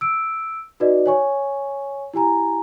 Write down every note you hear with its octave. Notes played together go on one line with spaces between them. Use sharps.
E6 D7
D#4 F#4 B4 D5 D#5
C#5 G#5 C#6
E4 G4 G#5 A#5